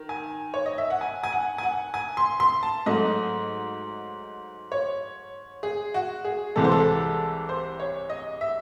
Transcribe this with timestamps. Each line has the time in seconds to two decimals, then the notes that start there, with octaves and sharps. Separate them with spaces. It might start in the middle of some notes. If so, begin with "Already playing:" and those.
Already playing: D#3
0.09 G#5
0.54 C#5
0.66 D#5
0.78 E5
0.90 F#5
1.01 G#5
1.24 G#5
1.32 F#5
1.58 G#5
1.63 F#5
1.94 G#5
2.17 C6
2.40 C6
2.63 A5
2.86 G#2 F#3 A3 D#5
4.72 C#5
5.63 G#4
5.94 F#4
6.25 G#4
6.56 C2 C3 E3 G#3 A4
6.64 C5
6.72 A4
7.49 C5
7.80 C#5
8.10 D#5
8.41 E5